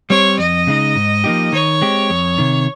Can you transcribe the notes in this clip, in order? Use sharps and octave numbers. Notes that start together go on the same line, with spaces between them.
G3 C4 G4 C5 C#5
F2 D#5
C#3 G#3 D#4
G#2
F3 A#3 D#4 G4
D#3 C#5
G#3 C4 G4
F2
C3 D#3